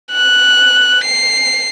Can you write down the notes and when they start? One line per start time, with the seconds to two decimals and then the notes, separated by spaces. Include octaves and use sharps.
0.12 F#6
1.04 C7